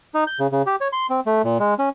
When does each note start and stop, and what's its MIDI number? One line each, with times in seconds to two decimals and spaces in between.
0.14 0.24 63
0.27 0.39 91
0.40 0.47 49
0.52 0.62 49
0.66 0.76 67
0.81 0.88 73
0.93 1.07 84
1.10 1.20 60
1.26 1.42 57
1.44 1.58 46
1.60 1.74 56
1.79 1.89 61